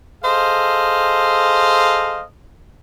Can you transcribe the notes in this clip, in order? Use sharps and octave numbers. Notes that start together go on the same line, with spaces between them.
G#4 A4 C5 D#5 F5